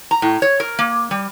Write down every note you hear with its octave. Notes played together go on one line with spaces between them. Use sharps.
A#5
A2
C#5
A#4
A#3
G3